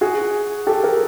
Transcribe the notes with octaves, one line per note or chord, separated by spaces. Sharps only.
F#4 G#4
G4 A4
G#4 A#4